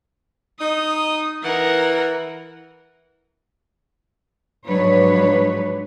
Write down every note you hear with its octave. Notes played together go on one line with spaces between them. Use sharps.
D#4 D#6
E3 A#4 F#5
G#2 F3 F#3 D4 B4 C#5